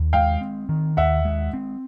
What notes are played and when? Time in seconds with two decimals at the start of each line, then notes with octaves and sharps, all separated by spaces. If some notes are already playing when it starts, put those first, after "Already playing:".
Already playing: D#2
0.13 G#3 F5 G5
0.41 C4
0.69 D#3
0.97 D#2 E5 F#5
1.25 G#3
1.53 C4